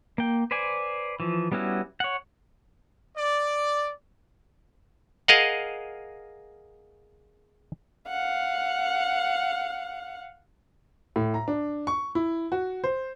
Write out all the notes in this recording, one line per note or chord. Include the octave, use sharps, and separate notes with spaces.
A#3 G5
B4 C5 D5 G#5
E3 F3
G3 B3 C#4 E4 F#4
C#5 F#5
D5
G#4 A#4 D#5 F5 F#5
F5 F#5
A2
A#5
D4
C#6
E4
F#4
C5